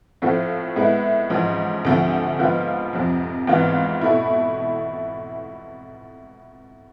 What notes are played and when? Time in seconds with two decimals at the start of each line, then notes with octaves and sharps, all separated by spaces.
0.22 A2 F3 A3 C4 F4
0.76 A2 G#3 B3 E4
1.30 A1 G#2 F3
1.85 D2 C3 F3 A3
2.39 G#2 F3 B3 F4
2.93 F1 F2 C3 F3
3.47 G#1 G#2 E3 B3 F4
4.01 B2 A3 E4